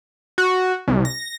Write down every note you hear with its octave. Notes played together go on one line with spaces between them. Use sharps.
F#4
C2
A#6